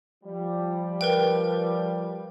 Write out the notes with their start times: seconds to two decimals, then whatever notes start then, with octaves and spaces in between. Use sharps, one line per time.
0.24 F3 G3
1.01 A#4 B4 G5